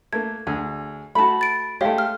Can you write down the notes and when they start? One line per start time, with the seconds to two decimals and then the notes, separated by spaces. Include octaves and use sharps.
0.13 A3 A#3 G#6
0.47 D2 G#4
1.15 A3 F#4 A5 B5
1.41 A6 D7
1.81 G#3 A3 G4 C#5 F5
1.98 F6